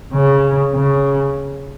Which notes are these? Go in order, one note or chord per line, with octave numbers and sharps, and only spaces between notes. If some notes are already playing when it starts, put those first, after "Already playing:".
C#3
C#3